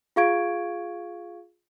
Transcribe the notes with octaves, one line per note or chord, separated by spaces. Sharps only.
F4 G#4 F5 C#6 G#6 D7